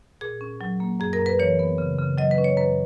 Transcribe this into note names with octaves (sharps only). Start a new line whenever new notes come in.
A#2 G#4
C#4
F#3
A#3
F#2 G#4
A#4
F#2
B4
E3 C#5
B3
C#3
C#3
F#3 D#5
B4
C#4
C#5
F#2 B4